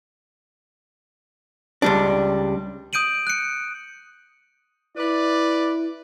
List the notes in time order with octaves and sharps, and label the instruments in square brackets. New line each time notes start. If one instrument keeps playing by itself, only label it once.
[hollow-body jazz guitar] C#2 G3 D4
[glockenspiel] D#6 G6 D7 D#7 F#7
F#6 C#7
[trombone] E4 [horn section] B4 D5